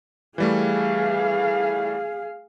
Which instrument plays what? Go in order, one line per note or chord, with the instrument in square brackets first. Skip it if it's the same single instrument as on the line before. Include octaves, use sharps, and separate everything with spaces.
[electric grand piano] E3 G3 A3 [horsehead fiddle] G#4 F5